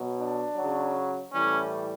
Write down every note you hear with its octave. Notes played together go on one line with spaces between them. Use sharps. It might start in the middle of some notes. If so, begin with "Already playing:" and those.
Already playing: B2 F#3
D4
C#3 F#3
A2 E3 G3 C#4